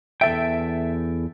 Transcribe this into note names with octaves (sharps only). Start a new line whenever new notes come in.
E2 A4 E5 G5